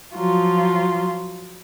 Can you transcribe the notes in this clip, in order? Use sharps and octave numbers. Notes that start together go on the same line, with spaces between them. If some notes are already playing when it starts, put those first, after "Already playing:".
F3 F#3 F4